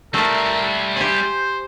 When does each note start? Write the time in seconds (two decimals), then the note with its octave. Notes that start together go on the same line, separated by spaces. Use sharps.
0.14 G3 A3 C4 A#4
0.97 G4 C5 G#5